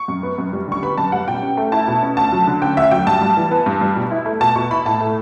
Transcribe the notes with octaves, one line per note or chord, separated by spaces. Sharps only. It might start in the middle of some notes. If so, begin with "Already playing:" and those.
Already playing: C#6
F#2
B3
F#2
G3
D3 C#6
B3 B5
F#2 A5
G3 F#5
B2 G5
C#4
A3
E4 A5
B2
C#4
D2 A5
F#3
D3
C#4 G5
D2 E5
F#3 G5
G2 A5
G3
E3
B3
G2
G3
B2
E4
A3
B2 A5
B2 C#6
E4 B5
A2 A5
A3